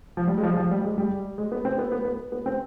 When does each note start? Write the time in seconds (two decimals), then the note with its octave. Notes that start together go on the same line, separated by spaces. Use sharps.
0.17 F3
0.28 G3
0.38 G#3
0.43 F3
0.48 G3
0.57 F3
0.71 G3
0.85 G#3
0.98 G3
1.38 G#3
1.52 B3
1.65 C4
1.78 B3
1.92 B3
2.05 B3
2.32 B3
2.46 C4